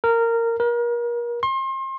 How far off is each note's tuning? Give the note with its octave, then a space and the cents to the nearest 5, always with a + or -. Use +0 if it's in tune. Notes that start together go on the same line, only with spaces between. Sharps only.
A#4 -15
A#4 +35
C6 +35